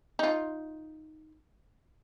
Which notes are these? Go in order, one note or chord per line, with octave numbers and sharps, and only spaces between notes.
D#4 F4